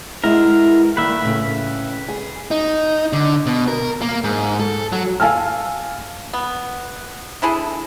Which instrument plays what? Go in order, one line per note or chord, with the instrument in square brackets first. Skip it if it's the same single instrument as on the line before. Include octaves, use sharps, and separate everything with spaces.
[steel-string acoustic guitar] G#3 B3 E4 [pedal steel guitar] A#4
[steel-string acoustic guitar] G2 D#3 A#3 [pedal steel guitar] B4 E5
[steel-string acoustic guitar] A2 C#3
G#4
[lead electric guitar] D#4
D3
B2
A#4
A#3
G#2
A4
F#3
[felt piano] F5 G#5 A5 E6 F6
[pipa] B3
D4 E4 G#4 A4